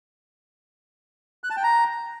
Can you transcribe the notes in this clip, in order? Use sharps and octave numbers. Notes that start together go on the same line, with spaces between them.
F#6
A5
G5
A#5